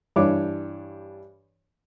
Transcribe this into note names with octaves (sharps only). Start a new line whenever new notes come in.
G2 E3 G3 D4 C#5 D6